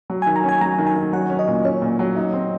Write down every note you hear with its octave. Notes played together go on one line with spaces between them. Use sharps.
F#3
D#3 G#5
A#5
C#4 G#5
F#3 A#5
D#3
G#5
D#3
F#3 F#5
C#4
D#5
A#2
C#4 C#5
A#2
F#3
D#4
C4